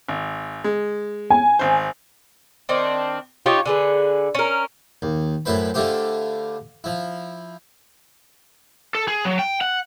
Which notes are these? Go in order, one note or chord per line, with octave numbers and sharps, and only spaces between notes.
G#1
G#3
G#5
G#1 C5
D#3 C4 D4
D#4 F4 G4 C#5
D3 G#4 B4
C#4 A#4
D#2
F#2 A2 E4 B4 C5 B5
D3 A3 E4 F4 G4 C5
F3 E4
A4
G#4
F#3
G5
F#5